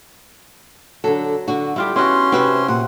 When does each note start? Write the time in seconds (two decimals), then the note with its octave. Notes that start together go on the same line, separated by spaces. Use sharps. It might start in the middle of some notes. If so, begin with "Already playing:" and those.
1.04 D3 F#3 A4
1.48 D3 F#4
1.76 G3 E4 F4 G4
1.96 B3 C#4 E4 F#4 C6
2.32 C3 C4 F#4 B4
2.68 A#2 F#5